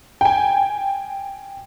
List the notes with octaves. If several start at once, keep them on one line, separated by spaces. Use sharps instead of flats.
G5 G#5